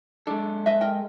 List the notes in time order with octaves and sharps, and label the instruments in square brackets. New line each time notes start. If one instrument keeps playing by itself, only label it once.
[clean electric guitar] G#3 A4 [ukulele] D4
[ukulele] B4 D#5 E5
A#4 D#5 G5